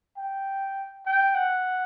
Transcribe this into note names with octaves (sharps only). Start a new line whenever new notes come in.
G5
G5
F#5